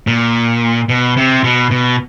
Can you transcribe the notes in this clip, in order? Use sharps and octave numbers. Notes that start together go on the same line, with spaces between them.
A#2
B2
C3
B2
B2